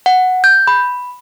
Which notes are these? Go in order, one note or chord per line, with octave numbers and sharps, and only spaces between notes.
F#5
G6
B5